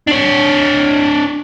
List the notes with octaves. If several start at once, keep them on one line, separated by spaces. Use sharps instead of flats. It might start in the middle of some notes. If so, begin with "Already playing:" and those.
D4 C#5